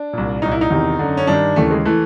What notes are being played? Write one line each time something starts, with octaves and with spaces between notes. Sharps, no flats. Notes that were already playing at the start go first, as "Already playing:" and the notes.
Already playing: D4
C2 A#2
C2 A#2 D#4
E4
D#4
E2 C3 D#3
F#2 D3
C#4
G2 D#3 D4
D#2 C#3 E3 A3
G#3
E3 A3